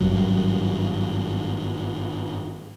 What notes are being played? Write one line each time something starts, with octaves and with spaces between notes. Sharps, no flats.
G#1 G2 F#3